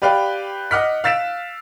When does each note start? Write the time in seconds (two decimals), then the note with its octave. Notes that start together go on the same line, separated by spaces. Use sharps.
0.02 G4 B4 D5 F5 G5
0.71 D#5 F#5 D6 F6 F#6 B6
1.04 F5 E6 A6 B6 D7 E7